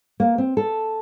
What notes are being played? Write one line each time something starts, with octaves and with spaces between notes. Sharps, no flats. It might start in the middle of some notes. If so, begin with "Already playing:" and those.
A#3
C4
A4